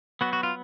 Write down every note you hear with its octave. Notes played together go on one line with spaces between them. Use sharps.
F#3 B3 F#4
F#4
F4